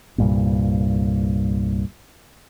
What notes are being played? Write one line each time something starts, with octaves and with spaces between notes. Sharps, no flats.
C2 G2 A#2